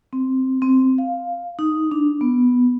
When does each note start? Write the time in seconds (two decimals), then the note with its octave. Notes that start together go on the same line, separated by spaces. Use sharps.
0.13 C4
0.62 C4
0.98 F5
1.59 D#4
1.91 D4
2.21 B3